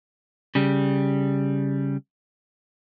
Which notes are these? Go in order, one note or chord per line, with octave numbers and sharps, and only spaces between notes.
C#3 G3